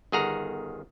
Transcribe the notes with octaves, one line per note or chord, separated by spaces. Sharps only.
G1 D#3 G#4 F#5 A#5